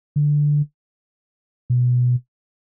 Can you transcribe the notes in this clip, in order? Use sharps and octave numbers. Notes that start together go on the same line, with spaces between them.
D3
B2